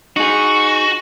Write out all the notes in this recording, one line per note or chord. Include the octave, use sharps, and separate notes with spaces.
D#4 F#4 G#4